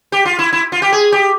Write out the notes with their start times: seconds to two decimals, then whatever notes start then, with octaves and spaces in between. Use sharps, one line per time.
0.12 G4
0.25 F4
0.39 E4
0.53 E4
0.72 F4
0.82 G4
0.92 G#4
1.12 G4